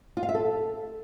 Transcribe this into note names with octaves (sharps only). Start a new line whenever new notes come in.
F4
F5
E5
A4